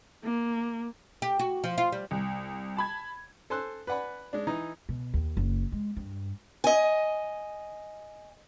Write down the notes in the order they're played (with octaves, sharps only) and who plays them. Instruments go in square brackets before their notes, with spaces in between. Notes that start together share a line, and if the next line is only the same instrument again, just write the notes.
[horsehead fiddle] A#3
[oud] G4
F#4
F3
F4
G3
[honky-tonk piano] C2
A5 B5 G#6
[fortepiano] A4 C5 G#5 C6 E6 F#6
B4 D5 F#5 G#5 B5
G#3 D4
E3 D#4 A#5
[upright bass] B2
D#2
F#1
G#3
G2
[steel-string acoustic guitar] D#5 G#5